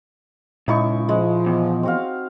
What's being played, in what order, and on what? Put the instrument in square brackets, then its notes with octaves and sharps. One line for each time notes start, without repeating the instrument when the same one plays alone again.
[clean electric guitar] C#2 [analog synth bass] A#2 [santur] D#4 E4 C#6
[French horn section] F3 [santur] G#3
[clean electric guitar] E2
[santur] C4 F#4 F5